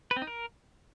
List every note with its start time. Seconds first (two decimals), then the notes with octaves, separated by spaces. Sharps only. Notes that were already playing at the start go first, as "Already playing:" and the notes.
0.11 B4
0.16 C4
0.22 D#4
0.27 A#4